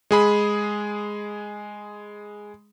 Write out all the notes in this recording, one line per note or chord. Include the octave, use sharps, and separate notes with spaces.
G#3 G#4 B5